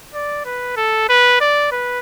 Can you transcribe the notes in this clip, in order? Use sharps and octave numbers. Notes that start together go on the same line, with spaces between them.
D5
B4
A4
B4
D5
B4